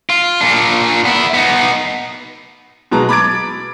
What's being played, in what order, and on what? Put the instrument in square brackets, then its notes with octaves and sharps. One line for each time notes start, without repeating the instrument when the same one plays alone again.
[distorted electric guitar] F4
A#2 D4
B3 E4
B3 D#4
[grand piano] B2 F#3 G#3 A5 A#5
B5 D6 G#6 A6 D7